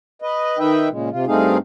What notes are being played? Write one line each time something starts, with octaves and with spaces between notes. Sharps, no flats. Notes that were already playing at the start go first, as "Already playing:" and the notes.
B4 D#5
D#3 D#4 B4 E5 G5
A#2 C#3 G#3
C3 F4
G2 A3 C4 D#4 G#4 F5